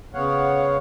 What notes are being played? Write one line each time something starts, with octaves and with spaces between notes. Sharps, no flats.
C#3 B3 C#5 F5 F#5